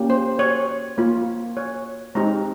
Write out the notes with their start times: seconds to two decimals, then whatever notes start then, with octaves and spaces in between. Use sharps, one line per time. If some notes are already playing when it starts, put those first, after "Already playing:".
Already playing: A#3 C#4 G4
0.10 C5
0.39 C#5
0.98 A#3 F4
1.57 C#5
2.15 G#3 C4 D#4 G4 A#5